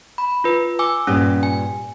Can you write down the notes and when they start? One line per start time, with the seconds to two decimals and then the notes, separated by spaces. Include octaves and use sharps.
0.18 B5
0.44 F4 B4
0.79 G#5 D6 E6
1.07 G2 A#2 C#4 G4
1.43 G#5